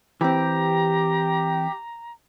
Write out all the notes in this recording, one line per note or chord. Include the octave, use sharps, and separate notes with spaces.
E3 C4 G4 A#5